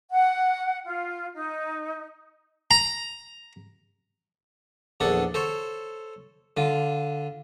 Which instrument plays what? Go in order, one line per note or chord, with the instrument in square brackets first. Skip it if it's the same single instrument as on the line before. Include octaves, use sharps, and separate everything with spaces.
[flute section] F#5
F4
D#4
[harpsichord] A#5
A#1 E2 D4 A4 F#5
A4 C5 C#5
D3 F4